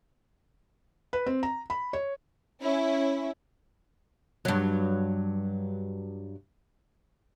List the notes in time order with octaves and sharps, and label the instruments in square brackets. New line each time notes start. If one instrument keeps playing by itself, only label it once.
[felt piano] B4
C4
A#5
B5
C#5
[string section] C#4 E4
[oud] G2 F#3